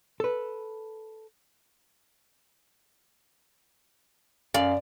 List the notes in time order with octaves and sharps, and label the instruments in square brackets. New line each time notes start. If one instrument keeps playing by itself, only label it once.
[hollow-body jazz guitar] A4 B4
[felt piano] F#2 F5 [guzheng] D5